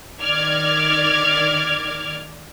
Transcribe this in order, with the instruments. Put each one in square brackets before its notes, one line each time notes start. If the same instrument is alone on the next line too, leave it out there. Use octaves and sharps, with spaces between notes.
[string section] D#3 D5 D6 F6 G#6